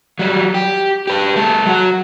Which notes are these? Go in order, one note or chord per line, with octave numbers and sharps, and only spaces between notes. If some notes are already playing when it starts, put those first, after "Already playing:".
F#3 G3
G4
G4 B4
G#3 A4
F#3 F#4